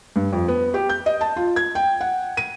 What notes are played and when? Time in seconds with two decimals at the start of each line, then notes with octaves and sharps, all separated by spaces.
0.16 G2
0.33 F2
0.48 B3
0.74 G4
0.89 G6
1.06 D#5
1.21 A5
1.36 F4
1.56 G#6
1.75 G5
2.01 F#5
2.37 D#7